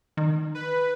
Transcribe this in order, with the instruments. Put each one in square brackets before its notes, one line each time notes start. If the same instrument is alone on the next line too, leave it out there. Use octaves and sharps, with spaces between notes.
[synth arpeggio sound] D#3
[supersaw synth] B4